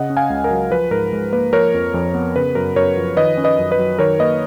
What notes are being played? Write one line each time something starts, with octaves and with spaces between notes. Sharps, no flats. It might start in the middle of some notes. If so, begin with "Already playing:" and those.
Already playing: C#3 D#5 F#5
C#4
F5 G#5
C#2
A#4
F#3
F3 B4
G#2 A#4
G#2
A#3 B4
F3 A#4 C#5
F2
F2
B3
C#3 B4
F#2 A#4
F#2 A#4 C#5
F3
D#3 B4 D#5
C#4
B4 D#5
F#2
B4 D#5
F#3
D#3 A#4 C#5
A#3 B4 D#5